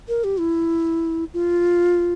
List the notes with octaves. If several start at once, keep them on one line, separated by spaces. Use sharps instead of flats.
A#4
G4
E4
F4